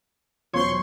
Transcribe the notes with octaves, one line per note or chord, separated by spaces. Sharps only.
E1 F#3 F4 C5 C#5 C6 C#6